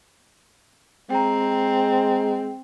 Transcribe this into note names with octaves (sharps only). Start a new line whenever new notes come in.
G#3 C4 G5 A#5